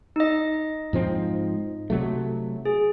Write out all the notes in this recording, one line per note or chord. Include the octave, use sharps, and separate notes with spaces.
D#4 D#5
G#2 F3 C4
C3 F#3 A3
G#4